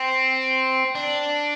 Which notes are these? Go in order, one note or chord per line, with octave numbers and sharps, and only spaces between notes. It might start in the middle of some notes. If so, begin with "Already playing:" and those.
Already playing: C4
D4